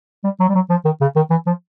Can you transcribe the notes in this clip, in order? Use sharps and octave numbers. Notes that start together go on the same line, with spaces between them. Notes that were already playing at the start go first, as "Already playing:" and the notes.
G3
F#3
G3
F#3
F3
D#3
C#3
D#3
E3
F3